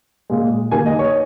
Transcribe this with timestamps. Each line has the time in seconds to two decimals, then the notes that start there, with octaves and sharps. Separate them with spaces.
0.30 A#2 G#3
0.71 D#3 A#3 G#5
0.86 D#5
0.99 C#5